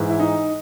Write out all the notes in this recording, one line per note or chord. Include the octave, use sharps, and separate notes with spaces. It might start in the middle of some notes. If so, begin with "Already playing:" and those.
Already playing: G#2 E3
E4
D#4